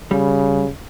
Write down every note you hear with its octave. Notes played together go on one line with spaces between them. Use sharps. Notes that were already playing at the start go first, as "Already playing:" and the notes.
C#3 G3